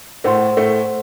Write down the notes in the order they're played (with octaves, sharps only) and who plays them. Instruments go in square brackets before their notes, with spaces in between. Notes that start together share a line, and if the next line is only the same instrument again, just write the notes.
[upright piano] A2 A3 [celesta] C5 F#5 C6
[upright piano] A2 A3